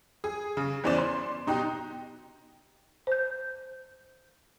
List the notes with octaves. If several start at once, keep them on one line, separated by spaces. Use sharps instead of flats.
G#4
C#3
E2 E3 C#4 C5 D5 E7
C6
B2 D#4 G4 F#6
C5 G6